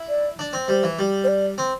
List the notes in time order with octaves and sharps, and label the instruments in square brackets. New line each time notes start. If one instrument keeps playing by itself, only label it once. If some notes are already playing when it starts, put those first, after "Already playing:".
Already playing: [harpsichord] E4
[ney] D5
[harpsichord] D4
C4
[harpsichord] G3 [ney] C5
[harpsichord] E3
G3
[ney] C5
D5
[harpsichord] C4